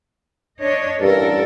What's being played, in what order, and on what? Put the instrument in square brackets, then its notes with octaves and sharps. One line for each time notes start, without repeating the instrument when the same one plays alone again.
[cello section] D4 C#5 D#5
[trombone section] A1 G2 [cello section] A4 A#4